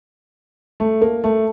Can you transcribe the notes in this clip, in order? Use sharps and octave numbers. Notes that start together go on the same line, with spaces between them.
A3
A#3
A3